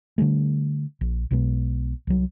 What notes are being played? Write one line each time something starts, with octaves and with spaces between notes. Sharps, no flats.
D3 F3 G3 A3
A#1
B1 B2 G#3 B3
C2 F#3